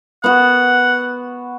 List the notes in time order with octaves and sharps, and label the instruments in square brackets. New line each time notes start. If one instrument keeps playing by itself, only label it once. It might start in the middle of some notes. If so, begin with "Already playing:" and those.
[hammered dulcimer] B3 F#4 [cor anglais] F#5